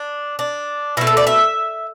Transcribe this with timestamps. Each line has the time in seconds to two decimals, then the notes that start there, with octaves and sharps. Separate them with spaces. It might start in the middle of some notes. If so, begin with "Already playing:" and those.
Already playing: D4
0.39 D4
0.97 B2 A3 E4
1.07 A4
1.17 D5
1.27 E5